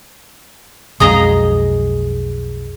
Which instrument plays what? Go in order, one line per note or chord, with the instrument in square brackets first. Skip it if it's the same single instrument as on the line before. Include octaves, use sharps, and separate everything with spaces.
[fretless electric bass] B1 F2 G#3 [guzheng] G#4 D#5 A#5